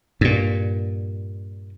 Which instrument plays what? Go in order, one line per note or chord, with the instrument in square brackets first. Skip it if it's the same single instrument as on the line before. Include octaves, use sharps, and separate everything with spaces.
[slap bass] G2 A#2